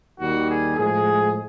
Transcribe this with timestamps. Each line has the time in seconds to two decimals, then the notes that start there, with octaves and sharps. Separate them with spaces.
0.18 D#2 D#3 G3 F#4
0.48 G#4
0.77 A2 F3 G#3 G#4